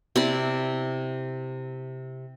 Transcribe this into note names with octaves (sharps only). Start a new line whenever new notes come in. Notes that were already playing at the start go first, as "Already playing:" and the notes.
C3 E4 D5